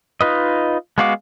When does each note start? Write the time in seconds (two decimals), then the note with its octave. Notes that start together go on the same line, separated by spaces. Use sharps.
0.21 D#4 F4 B4 D#5
0.98 G#3 B3 F#4 F5 D6